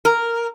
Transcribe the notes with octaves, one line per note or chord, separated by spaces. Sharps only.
A#4